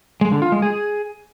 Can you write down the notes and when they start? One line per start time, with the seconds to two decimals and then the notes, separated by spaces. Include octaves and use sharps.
0.21 G#3
0.32 D3
0.42 F4
0.52 G#3
0.62 G#4